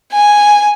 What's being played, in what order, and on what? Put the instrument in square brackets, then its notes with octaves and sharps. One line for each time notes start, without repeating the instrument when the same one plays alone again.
[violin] G#5